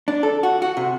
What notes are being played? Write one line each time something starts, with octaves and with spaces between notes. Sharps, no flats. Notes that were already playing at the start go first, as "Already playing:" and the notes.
D4
A4
F#4
F#4
C3